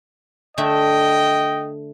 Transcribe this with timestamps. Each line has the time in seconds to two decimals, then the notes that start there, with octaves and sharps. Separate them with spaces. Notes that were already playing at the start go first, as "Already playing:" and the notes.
0.58 D3 A3 D#5 E5 G5